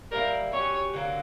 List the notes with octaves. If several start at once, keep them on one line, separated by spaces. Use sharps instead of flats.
G3 A#3 E4 A#4
F#3 C#4 G4 C#5
D3 F#3 A#3